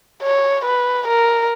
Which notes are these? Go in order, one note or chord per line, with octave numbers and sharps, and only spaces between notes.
C#5
B4
A#4